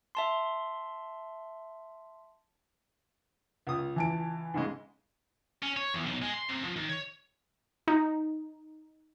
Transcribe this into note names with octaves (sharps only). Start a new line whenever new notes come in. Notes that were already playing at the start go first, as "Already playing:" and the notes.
E5 A5 C6
C#2 D#6
E3 A5 D7
G#2 C#3 G#3
C#4
C#5
E2
B1
G#3
C6
C3
F3
D#3
C#5
D#4